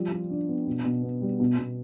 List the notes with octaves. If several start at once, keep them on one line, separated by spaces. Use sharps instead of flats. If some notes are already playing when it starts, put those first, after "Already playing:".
Already playing: F3 G3
F4
D4
B3
B2
B2
B3
G3
B2
B2